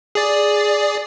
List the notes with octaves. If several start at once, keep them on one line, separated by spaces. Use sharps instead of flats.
G#4 D5